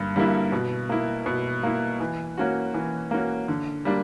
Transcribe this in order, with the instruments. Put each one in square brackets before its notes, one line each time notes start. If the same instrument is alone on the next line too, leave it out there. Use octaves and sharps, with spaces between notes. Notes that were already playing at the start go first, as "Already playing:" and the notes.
Already playing: [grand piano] G2 D3 A#3
D3 G3 A#3 E4
B2
A#3 E4
B2
A#3 E4
E3
A#3 C#4 F#4
E3
A#3 C#4 F#4
D3
G3 A#3 D4